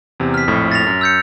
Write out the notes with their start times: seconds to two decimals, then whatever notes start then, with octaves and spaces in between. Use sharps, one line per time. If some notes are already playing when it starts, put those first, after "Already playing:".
0.20 E2 C3
0.34 F6 B6
0.47 A#1 F2 A2
0.72 A6 A#6 F7
0.87 F#2
1.01 E6 G6 C#7